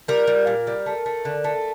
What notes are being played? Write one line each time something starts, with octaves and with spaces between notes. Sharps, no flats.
G3 A#4
G3
A#2
G3
A3
A3
D3
A3